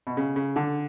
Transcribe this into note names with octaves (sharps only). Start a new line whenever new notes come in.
B2
C#3
C#3
D3